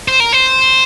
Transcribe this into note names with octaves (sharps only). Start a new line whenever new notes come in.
C5
A#4
C5